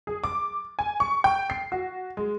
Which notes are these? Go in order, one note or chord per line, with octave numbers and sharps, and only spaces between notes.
G#4
D6
G#5
C#6
G5
C7
F#4
G#3